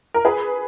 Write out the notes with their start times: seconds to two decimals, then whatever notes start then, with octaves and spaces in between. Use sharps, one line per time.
0.14 A#4
0.25 G#4 B4